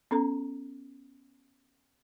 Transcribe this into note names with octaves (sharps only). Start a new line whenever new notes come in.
B3 C#4 A4 A#5